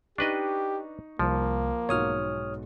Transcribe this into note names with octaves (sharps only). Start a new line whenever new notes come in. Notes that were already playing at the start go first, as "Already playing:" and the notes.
D4 D#4 G4 B4 D#5 C#6
C2 F3 A#3
B1 G#2 F#4 C#5 D#6 F6